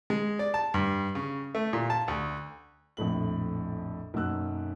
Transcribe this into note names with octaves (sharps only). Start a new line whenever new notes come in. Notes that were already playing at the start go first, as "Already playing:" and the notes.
G#3
D5
A5
G2
C#3
A3
A#2
A5
D2
A#1 F2 A2 F#7
B1 F#2 A#3 E6 F#6